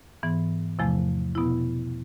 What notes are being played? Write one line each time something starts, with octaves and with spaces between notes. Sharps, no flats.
G#2 E3 B3
E2 C3 F3 A3
B2 B3 E4